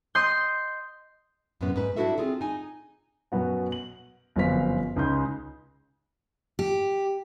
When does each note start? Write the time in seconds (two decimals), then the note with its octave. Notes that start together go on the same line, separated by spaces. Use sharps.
0.15 D#5 C6 G6
1.61 F#2 A2 C3 G#3 B3 C#4
1.76 G#2 B4
1.96 G3 D4 E4 F#4 A4 E5
2.18 C4 F4 G#4
2.41 D#4 G#5
3.32 F#2 B2 B3 F#4
3.72 F#7
4.36 G1 F#2 F3 C4 F5 B6
4.96 C#2 C#3 D#4 G#5 C6 G6
6.59 G4